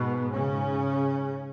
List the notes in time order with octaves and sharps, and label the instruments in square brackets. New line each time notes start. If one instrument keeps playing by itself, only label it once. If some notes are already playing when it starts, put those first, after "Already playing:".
Already playing: [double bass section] G#2 B2 B3
C#3 C#4